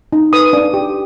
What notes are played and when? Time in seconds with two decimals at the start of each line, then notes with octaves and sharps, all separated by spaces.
0.13 D#4
0.33 B4 D#6
0.53 D4
0.74 G4